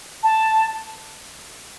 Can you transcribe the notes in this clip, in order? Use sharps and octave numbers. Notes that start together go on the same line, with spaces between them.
A5